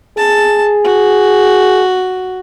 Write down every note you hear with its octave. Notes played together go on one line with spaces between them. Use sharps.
G#4 A5
F#4